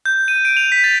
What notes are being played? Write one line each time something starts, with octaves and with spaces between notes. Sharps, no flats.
G6
D#7
D7
F7
B6
A6